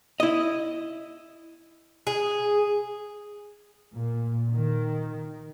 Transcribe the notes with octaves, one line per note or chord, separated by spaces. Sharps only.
E4 D#5
G#4
A#2
D#3